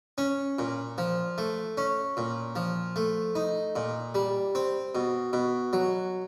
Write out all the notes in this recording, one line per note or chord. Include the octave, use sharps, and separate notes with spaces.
C#4
A#2
F3
A3
C#4
A#2
F3
A3
D#4
A#2
G3
C4
B2
B2
F#3